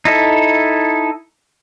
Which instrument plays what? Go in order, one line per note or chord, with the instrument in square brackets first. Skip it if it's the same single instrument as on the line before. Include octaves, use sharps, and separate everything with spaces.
[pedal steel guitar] D#4 E4 A4